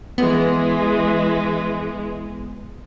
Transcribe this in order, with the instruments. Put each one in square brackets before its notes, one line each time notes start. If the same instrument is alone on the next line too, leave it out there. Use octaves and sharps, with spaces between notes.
[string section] E3 G#3 [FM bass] B3